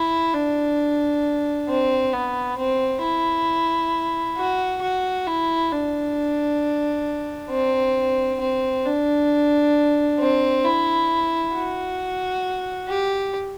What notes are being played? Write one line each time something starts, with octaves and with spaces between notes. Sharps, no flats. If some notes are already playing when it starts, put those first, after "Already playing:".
Already playing: E4
D4
C4
B3
C4
E4
F#4
F#4
E4
D4
C4
C4
D4
C4
E4
F#4
G4